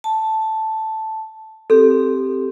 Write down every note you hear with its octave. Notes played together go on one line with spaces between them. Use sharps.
A5
C4 G4 A4